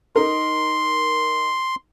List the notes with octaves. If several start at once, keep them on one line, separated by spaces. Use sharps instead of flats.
D#4 A#4 C6